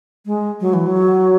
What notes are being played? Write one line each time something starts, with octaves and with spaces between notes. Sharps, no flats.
G#3
F#3
E3
F#3